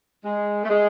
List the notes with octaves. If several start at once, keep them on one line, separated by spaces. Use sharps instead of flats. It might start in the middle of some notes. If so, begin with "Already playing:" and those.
G#3
A3
G#3